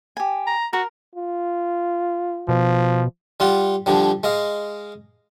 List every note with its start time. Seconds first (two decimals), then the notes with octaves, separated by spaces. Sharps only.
0.17 G4 G#5
0.47 A#5
0.73 F#4 A#4
1.15 F4
2.49 B2 F3
3.40 G3 F4 F#5
3.86 D3 F3 G3
4.24 G#3 D#5 F5